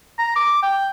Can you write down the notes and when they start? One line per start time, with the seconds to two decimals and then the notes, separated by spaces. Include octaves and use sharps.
0.19 A#5
0.36 D6
0.63 G5